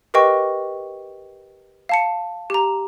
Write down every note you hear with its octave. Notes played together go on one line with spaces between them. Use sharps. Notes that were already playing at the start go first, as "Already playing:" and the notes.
G4 A#4 B4 D#5 G5 C#6
F5 A5 C#7
G4 A#5